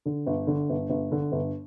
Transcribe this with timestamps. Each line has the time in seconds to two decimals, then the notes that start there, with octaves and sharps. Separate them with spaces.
0.06 D3
0.27 G1
0.47 D3
0.70 G1
0.90 G1
1.12 D3
1.32 G1